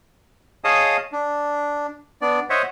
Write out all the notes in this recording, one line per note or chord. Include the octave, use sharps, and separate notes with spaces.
G#4 C#5 D#5 F5 A5 D#6
D4
B3 D4 D5
C5 C#5 D#5 E5 F#5